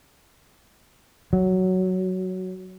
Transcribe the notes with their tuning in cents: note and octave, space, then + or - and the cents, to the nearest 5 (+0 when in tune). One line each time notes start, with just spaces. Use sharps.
F#3 +5